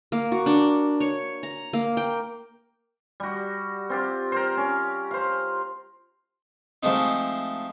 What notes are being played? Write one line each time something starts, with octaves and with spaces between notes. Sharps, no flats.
A#3
F#4
D4
C#5
A#5
A#3
G5
G3 F#4
C4 F4 G4
A#4 C5
C#4
C5 F5
F3 G#3 A3 C4 D#4